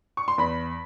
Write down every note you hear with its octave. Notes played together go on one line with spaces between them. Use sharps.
C#6
C6
E2 B5